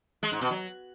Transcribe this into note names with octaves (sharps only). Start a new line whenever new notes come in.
G#3
G#2
B2
F#3